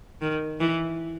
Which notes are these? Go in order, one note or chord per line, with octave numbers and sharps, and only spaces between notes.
D#3
E3